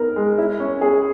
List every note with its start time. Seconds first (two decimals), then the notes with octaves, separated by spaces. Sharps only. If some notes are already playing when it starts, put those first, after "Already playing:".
Already playing: B3 D#4 A#4
0.16 G#3
0.38 E4
0.60 C#4
0.81 G#4